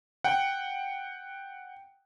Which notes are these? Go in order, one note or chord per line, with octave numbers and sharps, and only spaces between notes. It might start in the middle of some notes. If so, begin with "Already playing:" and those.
F#5 G5